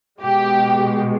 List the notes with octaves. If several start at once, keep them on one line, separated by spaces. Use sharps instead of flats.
B2 G#3 G4